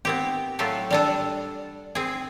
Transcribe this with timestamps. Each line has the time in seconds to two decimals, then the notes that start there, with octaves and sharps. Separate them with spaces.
0.05 B3 C4 G4
0.59 A2 F#3 F4 G4 A4
0.91 G3 D4 A4
1.95 C4 G#4